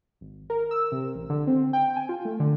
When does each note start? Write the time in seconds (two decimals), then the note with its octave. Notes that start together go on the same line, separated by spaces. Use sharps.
0.21 G#1
0.50 A#4
0.71 E6
0.92 C3
1.15 A1
1.30 D3
1.47 C4
1.73 G5
1.96 G#5
2.09 F4
2.25 A3
2.40 D3